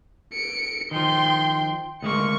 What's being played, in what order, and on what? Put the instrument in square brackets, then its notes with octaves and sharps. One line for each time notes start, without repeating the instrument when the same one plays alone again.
[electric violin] C#7 D7
[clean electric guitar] D#3 F3 [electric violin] G5 C6
[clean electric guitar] D2 G#3 A#3 [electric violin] C#6 C#7